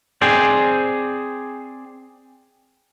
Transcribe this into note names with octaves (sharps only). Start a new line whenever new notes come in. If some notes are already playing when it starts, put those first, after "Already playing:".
C4 G#4 C5 D5